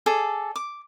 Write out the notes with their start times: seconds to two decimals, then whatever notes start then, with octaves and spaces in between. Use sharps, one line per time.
0.06 G#4 A4 D5
0.56 D6